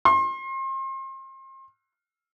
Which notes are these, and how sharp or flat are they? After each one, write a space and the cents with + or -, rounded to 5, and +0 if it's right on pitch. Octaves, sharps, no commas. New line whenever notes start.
C6 +35